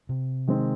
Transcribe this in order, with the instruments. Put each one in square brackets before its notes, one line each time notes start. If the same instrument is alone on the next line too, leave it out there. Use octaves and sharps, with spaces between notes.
[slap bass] C3
[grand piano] D#3 G#3 C4